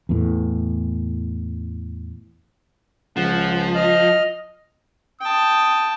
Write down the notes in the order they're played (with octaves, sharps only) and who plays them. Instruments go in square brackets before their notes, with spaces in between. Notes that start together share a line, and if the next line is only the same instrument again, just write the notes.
[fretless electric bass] E2 A2
[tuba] C#2 [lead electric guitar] F3 [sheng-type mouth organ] F#5
[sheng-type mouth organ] D#5 F6
[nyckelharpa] G5 A5 [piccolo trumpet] D#6